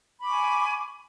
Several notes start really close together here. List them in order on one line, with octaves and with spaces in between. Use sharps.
B5 D6 C#6 G#5